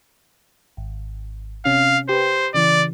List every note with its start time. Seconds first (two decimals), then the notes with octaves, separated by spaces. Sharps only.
0.77 G#1
1.65 C3 C#4 F5
2.09 G4 B4 C5
2.55 C#3 E3 D5